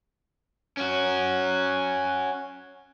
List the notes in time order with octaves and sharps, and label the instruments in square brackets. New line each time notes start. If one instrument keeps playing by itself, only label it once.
[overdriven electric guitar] C#4 F#4